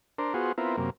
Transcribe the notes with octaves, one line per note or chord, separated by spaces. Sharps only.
D4 A#4 C5
B3 F4 F#4 G#4 C5
B3 C4 E4 F4 A#4
F#2 C3 A#3